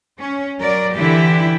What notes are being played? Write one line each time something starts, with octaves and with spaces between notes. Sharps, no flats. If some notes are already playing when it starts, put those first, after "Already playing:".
C#4
F#3 A#4 D5
D3 E3 E4 G4